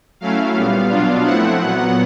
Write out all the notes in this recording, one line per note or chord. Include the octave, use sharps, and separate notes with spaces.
F#3 A3 C#4 E4 F5
A#2 G3 B3
B2 F#3 B3 D4 F4
F3 A3 C4 E4 F#5
A#2 F#3 B3